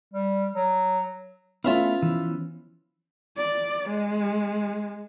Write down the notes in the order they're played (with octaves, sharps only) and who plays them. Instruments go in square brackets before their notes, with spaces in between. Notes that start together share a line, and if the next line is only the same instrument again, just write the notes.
[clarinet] G3
F#3
[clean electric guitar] A3 E4 [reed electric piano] B3 C#4 [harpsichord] F4 E5 F5
[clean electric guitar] E3 F3
[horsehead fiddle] D5
G#3